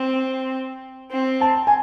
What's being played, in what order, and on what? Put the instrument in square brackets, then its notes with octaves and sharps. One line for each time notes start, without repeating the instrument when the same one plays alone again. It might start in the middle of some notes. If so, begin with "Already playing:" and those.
Already playing: [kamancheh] C4
C4
[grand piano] A5
G#5